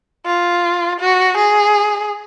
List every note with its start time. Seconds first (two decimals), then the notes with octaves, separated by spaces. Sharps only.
0.26 F4
1.00 F#4
1.37 G#4